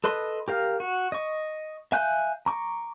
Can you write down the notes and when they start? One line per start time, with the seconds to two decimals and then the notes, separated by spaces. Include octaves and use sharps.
0.04 A4 B4 D#5 C6
0.48 G4 A#4 F5
0.80 F#4
1.12 D#5 C#6
1.92 E5 F5 G#5 F#6 G6
2.46 A#5 C#6 D6